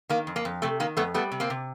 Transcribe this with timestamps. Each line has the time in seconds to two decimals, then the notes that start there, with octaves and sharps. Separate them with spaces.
0.09 D#3 A#3
0.27 F2
0.36 A#3
0.45 F2
0.62 C3 A3
0.80 D#3 A#3
0.97 F2 A3 B3
1.14 G3 A3 B3
1.32 C3
1.40 A#3 C4
1.50 C3